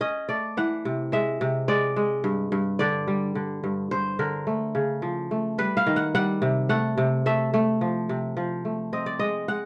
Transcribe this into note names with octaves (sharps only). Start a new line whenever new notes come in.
C#4 D#5
A3 D5
E3 F#5
C3
G#3 E5
C3
G#3 D5
G#3
G2
G2
D3 D5
G3
D3
G2
G2 C5
D3 A#4
A3
C#3
F3
A3
G3 B4
F5
D#3
F#5
G3 F#5
C3
A3 F#5
C3
A3 E5
A3
F3
C3
F3
A3
C4 D#5
D5
G#3 D#5
G#3 F#5